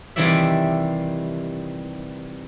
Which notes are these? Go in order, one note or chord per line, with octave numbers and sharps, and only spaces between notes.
C3 D#3 E3 G3 D5 E5